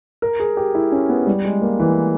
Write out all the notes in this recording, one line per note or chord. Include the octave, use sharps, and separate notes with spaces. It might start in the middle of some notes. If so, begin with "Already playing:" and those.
A#4
G#4
G4
E4
C#4
B3
G3
G#3
A#3
E3